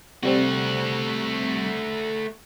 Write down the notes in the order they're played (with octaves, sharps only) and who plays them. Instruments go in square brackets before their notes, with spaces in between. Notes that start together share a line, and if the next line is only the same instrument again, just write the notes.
[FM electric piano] C3 G3 C4 [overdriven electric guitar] A3 F#4